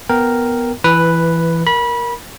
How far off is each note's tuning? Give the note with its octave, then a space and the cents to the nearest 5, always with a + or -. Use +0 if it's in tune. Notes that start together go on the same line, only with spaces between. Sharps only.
B3 +0 A#4 +0 G5 +0
E3 +15 B4 +0
A#4 +5 B5 -25